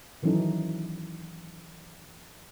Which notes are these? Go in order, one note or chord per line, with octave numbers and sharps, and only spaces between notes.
D#3 E3 F#3 C#4 D#4 A4